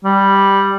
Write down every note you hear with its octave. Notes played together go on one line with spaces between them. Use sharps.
G3